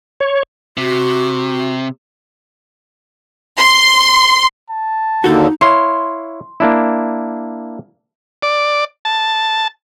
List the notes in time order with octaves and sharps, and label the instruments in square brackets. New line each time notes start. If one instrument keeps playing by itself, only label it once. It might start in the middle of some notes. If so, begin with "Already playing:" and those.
[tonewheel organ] C#5
[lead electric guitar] C3 [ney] F#4
[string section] C6
[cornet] A5
[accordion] D#2 D3 [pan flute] D#4 [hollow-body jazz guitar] F#4 A4
[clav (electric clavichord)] E4 C#5 F5 [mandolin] C6
[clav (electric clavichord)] A#3 D4 E4
[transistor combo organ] D5
A5